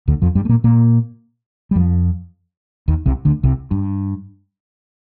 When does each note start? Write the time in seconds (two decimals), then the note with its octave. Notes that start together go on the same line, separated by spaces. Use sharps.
0.08 D2 D3
0.22 F2 F3
0.35 G2 G3
0.45 A3
0.49 A#2 A#3
0.64 A#2 A#3
1.71 G3
1.75 F2 F3
2.88 D#2 D#3
3.06 C2 C3
3.25 D2 D3
3.43 C2 C3
3.71 G2